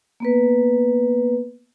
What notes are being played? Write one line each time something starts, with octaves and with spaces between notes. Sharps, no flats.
A#3 B3 B4